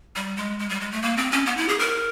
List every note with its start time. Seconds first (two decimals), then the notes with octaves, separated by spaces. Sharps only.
0.16 G3
0.37 G#3
0.59 G#3
0.69 G3
0.81 G#3
0.92 A3
1.02 A#3
1.17 C4
1.32 C#4
1.46 B3
1.57 E4
1.68 G#4
1.79 A#4